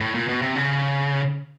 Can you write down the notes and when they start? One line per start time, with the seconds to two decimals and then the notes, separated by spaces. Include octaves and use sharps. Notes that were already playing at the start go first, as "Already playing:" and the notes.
0.01 A2
0.15 A#2
0.28 B2
0.42 C3
0.55 C#3